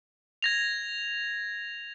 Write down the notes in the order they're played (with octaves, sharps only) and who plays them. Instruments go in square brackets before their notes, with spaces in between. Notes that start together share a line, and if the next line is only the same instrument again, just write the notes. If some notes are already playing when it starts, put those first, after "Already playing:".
[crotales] G#6 A#6 F7